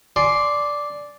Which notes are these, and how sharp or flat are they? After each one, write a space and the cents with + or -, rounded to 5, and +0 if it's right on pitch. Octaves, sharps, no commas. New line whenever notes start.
D5 -5 G#5 +25 C6 +0